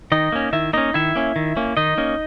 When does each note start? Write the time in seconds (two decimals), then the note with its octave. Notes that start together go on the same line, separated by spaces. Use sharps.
0.12 D#3 D#4 D#5
0.32 A#3 C#4
0.53 D#3 E4 E5
0.73 A#3 C#4 D#4 D#5
0.94 D#3 E4 E5
1.16 A#3 C#4
1.36 D#3
1.56 A#3 C#4
1.77 D#3 D#4 D#5
1.98 A#3 C#4